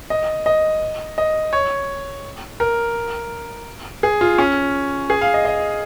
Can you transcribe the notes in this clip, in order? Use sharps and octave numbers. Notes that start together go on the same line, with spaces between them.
D#5
D#5
D#5
C#5
A#4
G#4
F4
C#4
G#4
F5
D#5
D#5